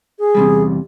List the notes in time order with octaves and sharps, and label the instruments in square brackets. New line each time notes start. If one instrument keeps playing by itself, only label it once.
[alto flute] G#4
[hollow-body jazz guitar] E2 C3 G3